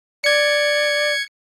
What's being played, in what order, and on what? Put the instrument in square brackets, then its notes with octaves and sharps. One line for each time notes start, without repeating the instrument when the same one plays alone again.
[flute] D5 [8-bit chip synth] G#6 C#7